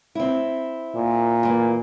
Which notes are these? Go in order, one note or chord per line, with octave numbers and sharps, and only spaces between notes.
C4 E4
A#2
E3 A#3